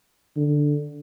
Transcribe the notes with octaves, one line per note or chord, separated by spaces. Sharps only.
D3